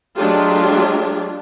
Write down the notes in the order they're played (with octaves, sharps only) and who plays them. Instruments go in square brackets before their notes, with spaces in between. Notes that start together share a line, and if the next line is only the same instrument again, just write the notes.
[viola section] F#3 G#3 A3 D4 F4 G4